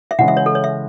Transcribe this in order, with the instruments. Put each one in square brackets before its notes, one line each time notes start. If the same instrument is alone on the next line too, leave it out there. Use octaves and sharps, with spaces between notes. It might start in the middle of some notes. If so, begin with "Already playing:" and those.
[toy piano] E5
[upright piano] C#3 E3 G#3 C#4 [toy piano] F#5
[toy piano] E5
C#5
A4
C#5
E5